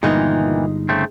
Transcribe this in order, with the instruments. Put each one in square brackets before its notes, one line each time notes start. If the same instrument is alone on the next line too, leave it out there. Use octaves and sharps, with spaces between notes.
[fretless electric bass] G1 [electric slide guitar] A#2 D#3 E3 [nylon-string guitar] G#3 D#4
[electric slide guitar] C#3 A3 C4